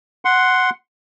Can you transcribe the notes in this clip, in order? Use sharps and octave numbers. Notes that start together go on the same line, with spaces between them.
F#5 C6